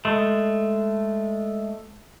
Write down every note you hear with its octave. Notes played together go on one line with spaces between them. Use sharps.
G#3 A3